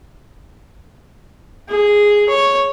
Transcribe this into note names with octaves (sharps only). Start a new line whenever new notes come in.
G#4
C#5